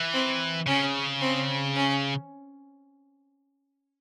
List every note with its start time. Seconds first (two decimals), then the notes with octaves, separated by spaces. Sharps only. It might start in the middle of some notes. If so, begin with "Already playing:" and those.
Already playing: E3
0.13 C4
0.66 C#3 C#4
1.21 C4
1.76 C#4